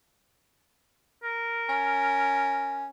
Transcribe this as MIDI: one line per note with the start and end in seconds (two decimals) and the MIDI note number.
1.23 2.89 70
1.69 2.86 61